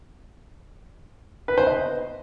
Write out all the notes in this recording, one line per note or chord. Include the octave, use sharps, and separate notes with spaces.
B4
C5
D#5